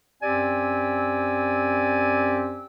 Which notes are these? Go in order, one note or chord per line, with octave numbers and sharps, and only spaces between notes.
F#2 C4 G4 D5 G#5 E6